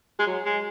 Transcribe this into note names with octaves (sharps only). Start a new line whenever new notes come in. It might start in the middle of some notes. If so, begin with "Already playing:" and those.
G#3
F#3
G#3